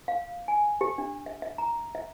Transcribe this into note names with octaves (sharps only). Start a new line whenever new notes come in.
F5
G#5
G4
D4
E5
E5
A#5
E5